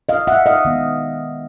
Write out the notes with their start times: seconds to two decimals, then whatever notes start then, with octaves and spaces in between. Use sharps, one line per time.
0.09 D#5 F5
0.27 E5 F#5
0.46 D#5 F5
0.65 D#3 G#3 B3